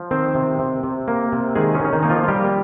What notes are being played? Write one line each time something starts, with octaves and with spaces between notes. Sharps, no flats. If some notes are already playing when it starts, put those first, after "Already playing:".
Already playing: F3
D#3 C4 C5
C3
C3
C3
A#3
C3
D#3 G#3 G#4
C#4
D#3
C#4
D#3 D#4
A#3 D#4
F3 F4
F4
G3 A#3 G4